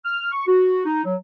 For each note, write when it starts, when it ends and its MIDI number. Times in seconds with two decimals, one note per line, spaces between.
0.05 0.30 89
0.32 0.43 85
0.47 0.82 66
0.85 1.04 63
1.05 1.15 54